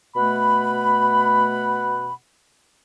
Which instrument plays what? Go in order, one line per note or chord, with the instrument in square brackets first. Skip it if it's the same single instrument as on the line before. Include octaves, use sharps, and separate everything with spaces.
[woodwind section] B2 A3 F#5 B5